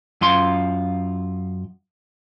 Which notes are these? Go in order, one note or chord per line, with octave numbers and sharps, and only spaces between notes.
F#2 F4 C6